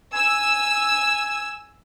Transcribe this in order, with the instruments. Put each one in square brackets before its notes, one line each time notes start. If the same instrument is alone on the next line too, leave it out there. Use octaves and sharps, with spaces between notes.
[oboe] G#5 [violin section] E6